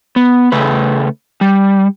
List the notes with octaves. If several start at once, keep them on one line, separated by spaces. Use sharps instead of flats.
B3
C#3 A3 B4
G3